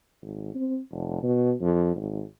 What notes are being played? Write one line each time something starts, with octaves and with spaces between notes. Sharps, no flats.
G#1
C4
F1
B2
F2
G#1